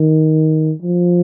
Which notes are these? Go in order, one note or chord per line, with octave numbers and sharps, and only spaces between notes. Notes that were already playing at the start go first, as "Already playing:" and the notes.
Already playing: D#3
F3